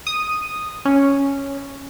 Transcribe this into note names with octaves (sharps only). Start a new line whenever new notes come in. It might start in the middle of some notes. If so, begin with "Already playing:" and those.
D#6
C#4